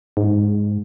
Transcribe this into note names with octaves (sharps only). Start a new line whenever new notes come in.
G#2